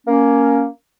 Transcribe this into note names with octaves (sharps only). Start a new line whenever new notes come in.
A#3 C#4